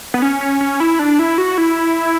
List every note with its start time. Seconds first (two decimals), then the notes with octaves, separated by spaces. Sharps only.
0.14 B3
0.22 C#4
0.41 C#4
0.61 C#4
0.80 E4
0.99 D4
1.19 E4
1.38 F#4
1.58 E4